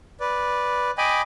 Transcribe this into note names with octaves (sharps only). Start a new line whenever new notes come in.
B4 D5
D#5 G5 G#5 B5 D6